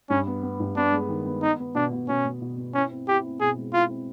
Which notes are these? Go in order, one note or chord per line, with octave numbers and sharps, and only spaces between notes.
G2 C#4
B3
B3
G2
B3 D4
G#3
D#3
B3
B3 D#4
B3
B2 D4
B2
B2 C#4
B2
B2
B3
C#4 E4
C4
E4 G4
C4
B2 G#4
G#3
E4 F4
C4